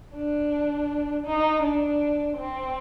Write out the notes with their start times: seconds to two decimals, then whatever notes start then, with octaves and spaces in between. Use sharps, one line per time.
0.15 D4
1.26 D#4
1.63 D4
2.37 C4